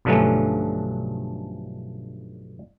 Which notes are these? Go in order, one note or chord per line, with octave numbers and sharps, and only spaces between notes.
B1 G2 D3 F3 A3 C#4